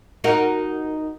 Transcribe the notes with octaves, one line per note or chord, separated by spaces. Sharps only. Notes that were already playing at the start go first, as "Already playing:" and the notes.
D#4 F#4 A#4